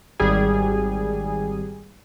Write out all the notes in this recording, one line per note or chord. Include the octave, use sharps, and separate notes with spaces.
G#1 G3 G#4 G#5